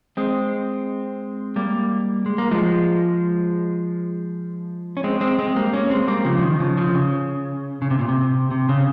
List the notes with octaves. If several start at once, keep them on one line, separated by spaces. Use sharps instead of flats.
G#3 C4
G3 A#3
G#3
A#3
F3 G#3
C#4
G#3 C4
G#3 C4
G#3 C4
G3 A#3
A#3 C#4
G#3 C4
G3 A#3
C#3 F3
D#3
C#3 F3
C#3 F3
C#3
C#3
C3
A#2
C3
C3
C#3